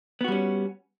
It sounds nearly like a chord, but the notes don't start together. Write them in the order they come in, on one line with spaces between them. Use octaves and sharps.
B3 F#4 G3 C#4